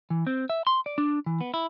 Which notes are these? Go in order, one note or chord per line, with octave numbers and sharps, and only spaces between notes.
E3
C4
E5
C6
D5
D4
E3
B3
E4